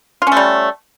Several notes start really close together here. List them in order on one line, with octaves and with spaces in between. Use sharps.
F4 C#4 A3 G3